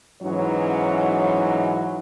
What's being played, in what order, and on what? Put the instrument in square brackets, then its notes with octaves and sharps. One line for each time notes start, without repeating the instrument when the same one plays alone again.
[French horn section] G#2 E3 F#3 C#4 D#4 C#5